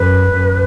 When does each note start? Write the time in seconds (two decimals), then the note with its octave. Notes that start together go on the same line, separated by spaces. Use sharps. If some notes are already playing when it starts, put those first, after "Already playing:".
Already playing: F#2 B4
0.33 F#2